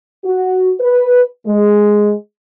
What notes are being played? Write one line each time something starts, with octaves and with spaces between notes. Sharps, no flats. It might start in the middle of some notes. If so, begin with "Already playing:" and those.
F#4
B4
G#3